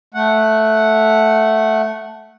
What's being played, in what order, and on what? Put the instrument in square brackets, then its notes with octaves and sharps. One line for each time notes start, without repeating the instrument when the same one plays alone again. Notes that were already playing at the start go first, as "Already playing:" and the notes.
[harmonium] A3 F#5